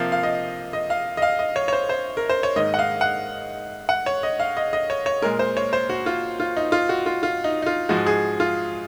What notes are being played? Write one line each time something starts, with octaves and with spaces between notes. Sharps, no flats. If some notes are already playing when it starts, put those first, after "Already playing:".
Already playing: C3 F3 A#3 F5
F5
D#5
D#5
F5
D#5
F5
D#5
C#5
C#5
C5
C5
A#4
C5
C#5
G#2 D#3 A#3 D#5
F#5
F5
F#5
F#5
C#5
D#5
F5
D#5
D#5
C#5
C#5
A#2 G#3 A#4
C5
C#5
C5
F#4
F4
F4
D#4
F4
F#4
F4
F4
D#4
D#4
F4
G#2 F3 G#3 F#4
G#4
F4